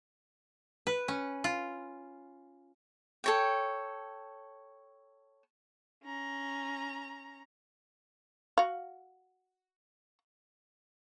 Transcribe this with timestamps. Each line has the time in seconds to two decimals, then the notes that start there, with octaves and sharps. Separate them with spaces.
0.87 B4
1.08 C#4
1.44 F4
3.24 A4 C#5 G5
6.04 C#4 A#5
8.58 F#4 F5